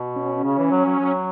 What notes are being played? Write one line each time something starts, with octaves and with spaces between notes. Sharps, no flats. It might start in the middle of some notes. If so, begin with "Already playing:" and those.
Already playing: B2
C#4
C#3
E3
F#3
F#3
F#3